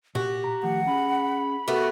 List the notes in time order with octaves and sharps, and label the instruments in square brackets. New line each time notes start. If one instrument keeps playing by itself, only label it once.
[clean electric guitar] A#2 [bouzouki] F#4 [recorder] G4
[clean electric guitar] A#5
[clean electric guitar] D#3 F3 A3 [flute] F#5
[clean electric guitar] C#4 G#4 [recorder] B5
[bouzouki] A3 B3 [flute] F#4 [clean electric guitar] G4 A#4